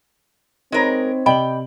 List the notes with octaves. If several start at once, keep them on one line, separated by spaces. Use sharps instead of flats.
G#3 C4 D#4 A#4 C#5 B5
C3 D5 D#5 G5 B5 F#7